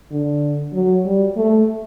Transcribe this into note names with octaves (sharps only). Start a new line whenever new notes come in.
D3
F#3
G3
A3